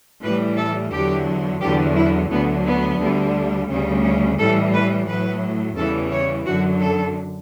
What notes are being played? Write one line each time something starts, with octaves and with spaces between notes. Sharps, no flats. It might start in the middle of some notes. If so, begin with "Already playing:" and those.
A2 E3 G3 B4
A4
E2 D3 F#3 G4
E2 D3 F#3 G4
E4
D2 D3 F#3 B3
B3
D2 D3 G3
D2 C#3 G3
C#4
A2 E3 G3 A4
B4
A2 F#3 B4
E2 C#3 E3 G3 A4
C#5
F#2 D3 F#3 F#4
A4